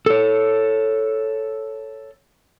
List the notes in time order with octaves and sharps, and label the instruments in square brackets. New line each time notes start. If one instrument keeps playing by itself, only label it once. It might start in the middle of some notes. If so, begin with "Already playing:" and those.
[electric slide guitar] A4 C#5